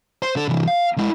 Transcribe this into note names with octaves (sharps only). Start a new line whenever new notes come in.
C5
D3 A4
C3 E3
F5
G#3 E4